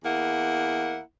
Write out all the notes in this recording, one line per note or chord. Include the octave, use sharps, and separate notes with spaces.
E2 A#3 E4 F#5